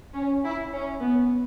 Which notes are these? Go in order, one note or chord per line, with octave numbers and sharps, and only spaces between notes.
C#4
E4
C#4
B3